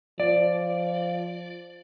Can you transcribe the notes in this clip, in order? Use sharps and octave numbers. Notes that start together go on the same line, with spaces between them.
F3 D5